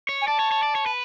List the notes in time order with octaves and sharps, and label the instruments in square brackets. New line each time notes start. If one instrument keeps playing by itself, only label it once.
[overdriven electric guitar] C#5
[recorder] G#5
[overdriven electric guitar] D5 [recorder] A5
[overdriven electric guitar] C#5
C#5
D5
C#5
B4